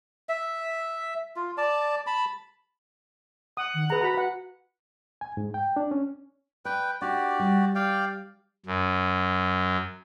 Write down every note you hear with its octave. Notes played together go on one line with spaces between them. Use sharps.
E5
F4
D5 A5
A5 B5
F#5 D#6
D#3
G#4 B4 A#5
F#4 A#5 B5
B4 F#5
G#5
G#2
G5
D4
C#4
B4 D5 G5
D4 F#4 G4 D5
G3
D5 F5 G5
F#2